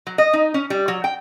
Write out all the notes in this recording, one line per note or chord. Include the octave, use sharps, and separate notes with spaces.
F#3
D#5
D#4
C#4
G3
F#3
G5